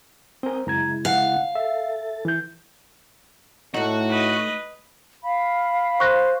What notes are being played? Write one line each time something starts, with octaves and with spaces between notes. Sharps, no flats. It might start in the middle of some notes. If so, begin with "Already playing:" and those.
C4 A#4 G#5 D#6 G6
F#2 C#3 G#3 E4 A#5 G#6
F5 F#5
A4 E5 A6
E3 G6
A2 A3 D#4 F#4
B4 D#5
F5 B5
C5 C#6 F#6 A#6